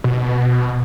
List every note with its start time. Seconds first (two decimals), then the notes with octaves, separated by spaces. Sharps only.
0.04 B2